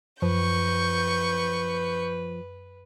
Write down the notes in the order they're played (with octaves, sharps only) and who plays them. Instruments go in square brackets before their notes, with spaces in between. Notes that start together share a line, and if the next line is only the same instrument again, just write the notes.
[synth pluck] F#2 [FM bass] F3 [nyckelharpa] B4 [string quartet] C#6 G6